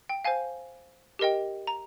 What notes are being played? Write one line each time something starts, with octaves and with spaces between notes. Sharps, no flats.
G5
C5 F5 G#5
G4 A#4 D#5 G5
A#5